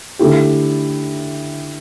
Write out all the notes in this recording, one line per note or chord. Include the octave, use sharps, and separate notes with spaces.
D3 A3 E4 G4